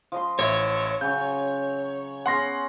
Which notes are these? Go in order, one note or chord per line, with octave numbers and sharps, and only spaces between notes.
F3 D#5 C6
A1 C#5 E5
C#3 F#3 G6
B3 C#4 G#4 F#5 C6 A#6